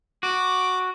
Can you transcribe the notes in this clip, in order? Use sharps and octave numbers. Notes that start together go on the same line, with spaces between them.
F#4 D6